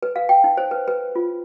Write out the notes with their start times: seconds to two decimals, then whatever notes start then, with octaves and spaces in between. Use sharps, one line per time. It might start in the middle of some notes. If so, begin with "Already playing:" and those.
0.03 B4
0.16 F5
0.29 G5
0.44 D#4
0.57 C5
0.71 B4
0.88 B4
1.16 F4